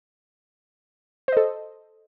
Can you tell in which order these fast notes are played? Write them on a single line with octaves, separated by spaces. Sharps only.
C5 D#5 A4